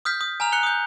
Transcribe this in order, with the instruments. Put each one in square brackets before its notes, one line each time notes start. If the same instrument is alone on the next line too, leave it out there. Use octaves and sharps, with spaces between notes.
[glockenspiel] D#6 F6 G6 B6
D#6
G#5 A#5 F6 F7
F#6 C#7 F7 G7
D#6 G6